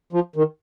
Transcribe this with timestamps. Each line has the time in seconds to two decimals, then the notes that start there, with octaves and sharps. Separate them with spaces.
0.13 F3
0.36 D#3